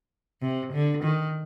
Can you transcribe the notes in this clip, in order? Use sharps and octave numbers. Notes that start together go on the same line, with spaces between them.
C3
D3
D#3